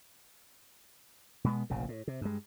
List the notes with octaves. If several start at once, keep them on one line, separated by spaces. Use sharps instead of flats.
B2 G#3 B3
F1 A#1 A#2 C#3
A2
C3
G2 G#3